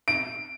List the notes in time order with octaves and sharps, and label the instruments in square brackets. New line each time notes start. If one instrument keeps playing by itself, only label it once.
[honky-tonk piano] D7